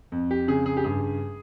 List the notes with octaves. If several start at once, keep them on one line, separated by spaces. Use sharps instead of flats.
F2
G4
C#3 G#4
G#4
G4
G2 G#4